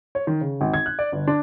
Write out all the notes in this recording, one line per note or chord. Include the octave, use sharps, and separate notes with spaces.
C#5
D#3
C#3
G#1
G#6
F#6
D5
G1
D4